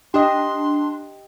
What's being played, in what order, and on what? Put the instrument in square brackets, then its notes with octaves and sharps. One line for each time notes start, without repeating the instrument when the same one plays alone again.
[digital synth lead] D4 [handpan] G4 D#5 [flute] C6